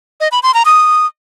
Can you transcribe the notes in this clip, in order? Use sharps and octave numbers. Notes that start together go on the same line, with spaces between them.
D#5
B5
C6
A#5
D#6